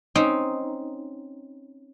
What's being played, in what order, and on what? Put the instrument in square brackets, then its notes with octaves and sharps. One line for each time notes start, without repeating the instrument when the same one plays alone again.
[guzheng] C4 C#4 D#4